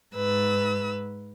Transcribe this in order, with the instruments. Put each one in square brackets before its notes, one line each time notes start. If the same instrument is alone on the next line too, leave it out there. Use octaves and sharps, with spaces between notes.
[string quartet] G#2 B4 E6